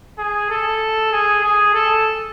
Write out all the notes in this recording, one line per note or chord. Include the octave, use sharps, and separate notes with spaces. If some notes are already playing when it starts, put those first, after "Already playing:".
G#4
A4
G#4
G#4
A4